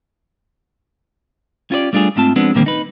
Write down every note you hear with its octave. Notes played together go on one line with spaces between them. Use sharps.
C#4 F4 G4 C5 D5
G3 A3 D4 F4 G#4
G#2 A3 C4 F4 A5
F3 G#3 B3 C4 D4
A#2 D3 D#3 G3 A#3 C4
D#4 B4